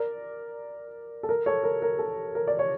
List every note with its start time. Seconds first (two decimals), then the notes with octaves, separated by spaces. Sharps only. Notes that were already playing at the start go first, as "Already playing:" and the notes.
Already playing: A#4 D5
1.23 A4
1.29 A#4
1.46 A4 C#5
1.64 A#4
1.82 A#4
1.99 A4
2.35 A#4
2.47 D5
2.59 C#5